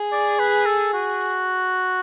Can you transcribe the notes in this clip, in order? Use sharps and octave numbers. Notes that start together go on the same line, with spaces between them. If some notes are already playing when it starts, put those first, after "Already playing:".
Already playing: G#4
D5
B4
A4
F#4